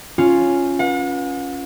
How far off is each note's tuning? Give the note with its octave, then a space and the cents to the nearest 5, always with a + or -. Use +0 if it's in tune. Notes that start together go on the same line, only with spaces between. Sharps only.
C#4 +0 F4 +0
B4 -25 F#5 -45